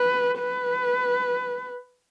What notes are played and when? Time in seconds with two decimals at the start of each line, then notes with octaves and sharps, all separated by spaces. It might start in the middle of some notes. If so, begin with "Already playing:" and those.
Already playing: B4
0.39 B4